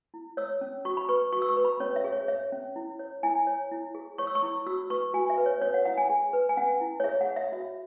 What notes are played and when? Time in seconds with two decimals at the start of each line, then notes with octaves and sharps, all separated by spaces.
0.14 E4
0.37 C#5 E6
0.61 C#4
0.85 F#4 C#6
0.97 B5
1.09 B4 C#6
1.33 F#4 C#6
1.42 E6
1.49 C#6
1.57 B4
1.65 B5
1.80 C#4 C#5
1.96 E5
2.04 G#4
2.12 C#5
2.28 C#5 E5
2.52 C#4
2.76 E4
2.99 C#5
3.23 E4 G#5
3.47 C#5
3.71 E4
3.95 G#4
4.18 C#5 C#6
4.27 E6
4.35 C#6
4.43 E4
4.67 F#4 E6
4.90 B4 C#6
5.14 F#4 G#5
5.30 E5
5.38 B4
5.46 C#5
5.61 C#4 C#5
5.74 F#5
5.85 E4 F#5
5.98 G#5
6.10 G#4
6.33 B4
6.49 G#5
6.57 C#4 F#5
6.81 E4
7.00 C#5
7.04 G#4 E5
7.21 F#5
7.29 C#5
7.36 E5
7.52 F#4 E5